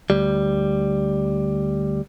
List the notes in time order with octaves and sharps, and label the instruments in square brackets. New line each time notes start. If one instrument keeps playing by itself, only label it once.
[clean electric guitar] D2 G3